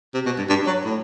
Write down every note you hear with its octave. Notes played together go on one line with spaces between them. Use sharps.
C3
B2
G2
G2
F#3
A2